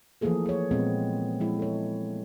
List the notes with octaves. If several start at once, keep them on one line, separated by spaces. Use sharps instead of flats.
E3 F3 A3 A#3 G#4 A4
G#4 C#5
A#2 E3 G#3 B3 C4
F3 G#3 E4
A4 C#5